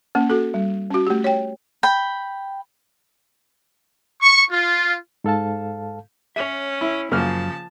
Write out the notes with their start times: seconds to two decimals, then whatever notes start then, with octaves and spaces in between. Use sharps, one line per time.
0.15 A#3 C#4
0.30 F#4 A4
0.54 G3
0.90 C#4 F#4
1.07 A3 G4
1.24 C#5 G5
1.83 G5 B5
4.22 C#6
4.51 F4
5.24 G#2 A4 F5 A5
6.36 C#4 C#5 E5
6.81 E4
7.12 F#2 C#3 F3 A#3 A5 F6